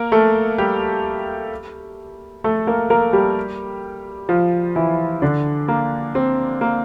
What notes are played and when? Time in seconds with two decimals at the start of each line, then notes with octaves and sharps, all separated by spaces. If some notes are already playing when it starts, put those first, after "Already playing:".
Already playing: A#3 A#4
0.12 A3 A4
0.58 G3 G4
2.44 A3 A4
2.67 A#3 A#4
2.90 A#3 A#4
3.13 G3 G4
4.29 F3 F4
4.76 E3 E4
5.22 D3 D4
5.68 A#3
6.15 C4
6.61 A#3